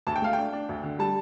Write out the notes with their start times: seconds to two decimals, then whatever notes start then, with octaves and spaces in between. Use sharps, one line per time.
0.07 D2 A5
0.16 G5
0.22 A3 F5
0.33 D4 G5
0.53 D4
0.69 D2
0.83 D3
0.99 G3 A5